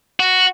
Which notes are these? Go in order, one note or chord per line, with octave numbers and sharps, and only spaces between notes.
F#4